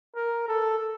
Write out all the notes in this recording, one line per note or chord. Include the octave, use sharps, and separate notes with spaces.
A#4
A4